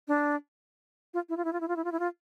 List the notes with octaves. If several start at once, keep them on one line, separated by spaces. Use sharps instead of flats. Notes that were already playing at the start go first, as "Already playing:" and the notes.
D4
F4
E4
F4
E4
F4
E4
F4
E4
F4
E4
F4